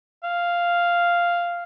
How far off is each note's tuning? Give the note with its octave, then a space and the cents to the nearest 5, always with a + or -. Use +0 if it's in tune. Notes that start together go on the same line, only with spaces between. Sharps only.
F5 -5